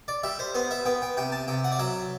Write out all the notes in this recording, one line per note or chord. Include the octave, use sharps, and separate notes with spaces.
D5
G3 E5
C5
B3 C5
E5
B3 G5
G5
C3 G5
A5
C3 G5
F#5
D5
F#3 E5